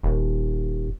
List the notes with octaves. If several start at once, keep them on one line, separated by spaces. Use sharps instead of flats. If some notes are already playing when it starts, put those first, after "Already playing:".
D#1